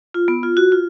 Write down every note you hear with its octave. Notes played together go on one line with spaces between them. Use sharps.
F4
B3
F4
F#4
F4